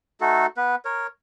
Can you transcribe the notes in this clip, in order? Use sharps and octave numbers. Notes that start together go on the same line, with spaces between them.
A3 D#4 F#4 A4
B3 B4
A#4 C#5